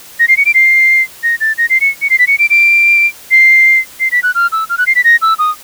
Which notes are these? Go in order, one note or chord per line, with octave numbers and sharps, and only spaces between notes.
A#6
C7
C#7
D7
C7
A#6
A6
A#6
C7
C#7
C#7
C7
B6
C#7
D7
D7
C7
C7
B6
F#6
F6
E6
F6
F#6
C7
B6
A#6
E6
D#6